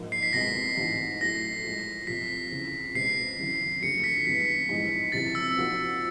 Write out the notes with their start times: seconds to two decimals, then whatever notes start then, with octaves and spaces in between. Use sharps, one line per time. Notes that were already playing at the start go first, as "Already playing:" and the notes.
Already playing: A#1 G#2 F3 A#3
0.12 C7
0.23 B6
0.33 C2 B2 G#3 A#6
0.77 A1 G#2 F3
1.21 A2 F#3 A3 A#6
1.64 A#2 F3 G#3
2.07 F2 C3 F3 B6
2.51 C#2 C#3 E3
2.95 C#2 B2 G#3 C4 E4 C7
3.38 G#1 F#2 C#3 E3
3.82 F#1 F2 D3 F#3 A3 C#7
4.04 B6
4.26 G#1 G2 E3 G#3 B3 B6
4.69 A#1 G#2 E3 G#3
5.12 F#1 F2 C3 E3 A6
5.35 E6
5.57 A#2 F3 A#3 D#4 F#4